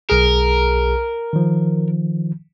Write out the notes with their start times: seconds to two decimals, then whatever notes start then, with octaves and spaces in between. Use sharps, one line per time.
0.10 B1 G#4 A#4
1.33 D#3 F3